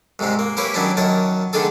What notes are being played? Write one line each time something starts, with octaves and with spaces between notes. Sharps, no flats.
C2 G#2 C3 G#3 C4
A#3
A#3 E4 G4 B4 C#5 G#5
D#3 F#3 G3 C#4 D4 E4
F#2 D#3 C#5 D#5 A5
D3 D#3 A3 D4 G#4 A4